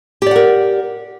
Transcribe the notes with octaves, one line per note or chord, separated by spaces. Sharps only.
G4 A#4 D5 F#5